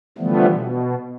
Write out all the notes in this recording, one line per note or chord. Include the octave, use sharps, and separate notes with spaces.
D3 E3 F3 G3 A3 B3
B2